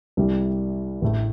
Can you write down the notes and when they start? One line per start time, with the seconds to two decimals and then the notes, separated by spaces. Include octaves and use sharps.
0.17 C2 C3 G3
1.02 A1 A2 A3